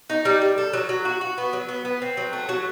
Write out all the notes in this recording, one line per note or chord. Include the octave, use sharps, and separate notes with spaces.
D#4
G3
G3
A4
F#3
F#3
F#4
F#4
B3
F#3
B3
B3
C4
F#3
A3
F#3